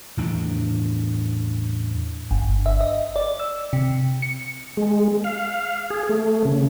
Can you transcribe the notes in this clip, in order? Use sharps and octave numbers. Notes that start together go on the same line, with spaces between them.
E2 A2 D4
G1
E5
D#5
D5
E6
C3
C#7
G#3
F5
G#4
A3
C#3